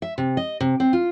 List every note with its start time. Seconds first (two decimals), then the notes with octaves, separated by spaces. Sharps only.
0.02 E5
0.18 C3
0.37 D#5
0.60 C3
0.80 C4
0.93 F4